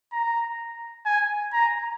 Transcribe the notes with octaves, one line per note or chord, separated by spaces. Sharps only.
A#5
G#5
A#5